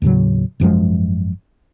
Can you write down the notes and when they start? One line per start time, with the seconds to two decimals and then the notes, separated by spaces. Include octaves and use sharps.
0.02 D#2 A2 C#3 F#3
0.60 G#1 F#2 F3 G#3